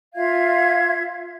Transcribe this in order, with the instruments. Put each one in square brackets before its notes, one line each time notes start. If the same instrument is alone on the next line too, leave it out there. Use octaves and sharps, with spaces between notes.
[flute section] F4 E5 F5 G#6